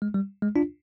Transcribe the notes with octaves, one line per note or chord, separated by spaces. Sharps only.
G#3
G3
G#3
D4 F4